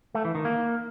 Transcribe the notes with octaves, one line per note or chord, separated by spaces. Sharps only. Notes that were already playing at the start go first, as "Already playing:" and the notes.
A3
E3
D#3
A#3